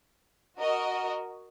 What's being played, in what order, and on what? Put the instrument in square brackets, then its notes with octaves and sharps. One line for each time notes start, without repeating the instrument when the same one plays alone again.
[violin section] F#4 A#4 D#5